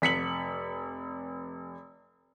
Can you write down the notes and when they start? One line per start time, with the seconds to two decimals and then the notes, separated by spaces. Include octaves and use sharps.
0.02 F1 B6 C#7 F#7